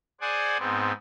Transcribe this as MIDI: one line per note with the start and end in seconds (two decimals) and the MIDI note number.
0.21 0.57 68
0.21 0.57 72
0.21 0.57 74
0.21 0.57 78
0.21 0.57 80
0.59 0.92 44
0.59 0.92 59
0.59 0.92 60